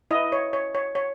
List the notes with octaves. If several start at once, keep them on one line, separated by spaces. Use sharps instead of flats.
E4 B4 D#5
C#5
C#5
C#5
C#5